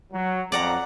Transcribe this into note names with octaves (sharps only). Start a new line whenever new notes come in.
F#3
F2 D5 F#5 A#5